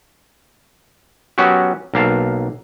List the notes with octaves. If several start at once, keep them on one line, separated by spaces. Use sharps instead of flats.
F#3 B3 C#4 F#4 G4
B1 A#3 F5 A5